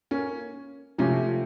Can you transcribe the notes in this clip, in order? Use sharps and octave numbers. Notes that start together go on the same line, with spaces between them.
A#3 C#4
C3 F3 A3 C#4 F4